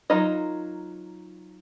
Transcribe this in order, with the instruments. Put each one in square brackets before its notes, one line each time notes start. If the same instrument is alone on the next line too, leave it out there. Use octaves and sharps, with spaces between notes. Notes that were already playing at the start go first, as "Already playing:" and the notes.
[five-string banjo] F#3 D#4 F4 A#4 D#5